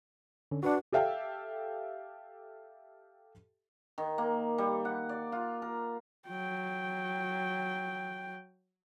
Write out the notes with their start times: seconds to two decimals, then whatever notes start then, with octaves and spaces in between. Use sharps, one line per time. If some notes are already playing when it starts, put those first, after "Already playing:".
0.51 D3 C#4
0.63 D4 F#4 B4 F#5
0.92 G4 A4 E5 F5 G5
3.98 D#3
4.18 A#3
4.58 G3
4.85 F#5
5.09 D5
5.32 F4
5.62 A#4
6.28 F#3 G5